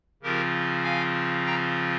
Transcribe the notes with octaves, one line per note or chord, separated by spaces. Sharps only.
C#3 F3 C4 F4 G4 A#4
F5 G#5
G5 A#5